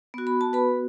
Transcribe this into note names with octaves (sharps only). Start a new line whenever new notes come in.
B3 F#4
B5
A5
B4 B5